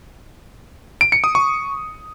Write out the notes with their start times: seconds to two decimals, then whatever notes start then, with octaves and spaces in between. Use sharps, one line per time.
1.01 D7
1.12 C#7
1.24 D#6
1.35 C#6